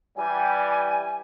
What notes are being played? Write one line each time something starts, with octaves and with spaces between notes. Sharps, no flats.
E3 G3 G#5